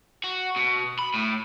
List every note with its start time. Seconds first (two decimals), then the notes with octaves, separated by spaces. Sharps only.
0.24 F#4
0.57 B2
0.99 B5
1.14 A2